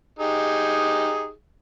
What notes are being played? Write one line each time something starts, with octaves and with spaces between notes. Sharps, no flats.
D#4 G4 G#4